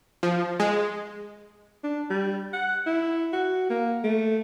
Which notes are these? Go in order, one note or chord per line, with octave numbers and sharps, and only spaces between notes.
F3
G#3
D4
G3
F#5
E4
F#4
A#3
A3